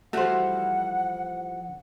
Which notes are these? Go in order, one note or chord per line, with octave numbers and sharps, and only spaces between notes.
E3 F3 G3 A3 F#4 C5 F#5